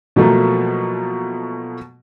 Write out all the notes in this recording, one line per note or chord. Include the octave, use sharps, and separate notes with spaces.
B2 F3 F#3 A3 A#3